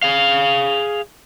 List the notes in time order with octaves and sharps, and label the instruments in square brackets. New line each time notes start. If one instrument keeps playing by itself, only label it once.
[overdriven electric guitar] G#4 F5